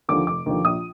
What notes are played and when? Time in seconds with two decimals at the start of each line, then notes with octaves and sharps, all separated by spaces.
0.09 D#2 D3 F3 D6
0.26 F1 D6
0.46 D#2 D3 F3
0.64 A#1 D#6